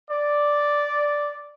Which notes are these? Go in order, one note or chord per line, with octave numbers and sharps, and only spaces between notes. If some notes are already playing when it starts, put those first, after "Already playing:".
D5